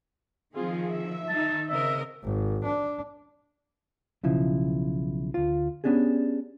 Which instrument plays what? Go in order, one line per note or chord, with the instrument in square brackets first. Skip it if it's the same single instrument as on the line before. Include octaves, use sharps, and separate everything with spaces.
[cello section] D#3 F3 [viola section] C4 F4 G#4
[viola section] E5
[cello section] D#3 D#4 [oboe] A5
[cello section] C#3 C4 A#4 [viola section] D#5 [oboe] E5
[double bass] G#1
D4
[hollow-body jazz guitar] B1 C#3 F3 E4
D2 F4
B3 C#4 D4 G4 G#4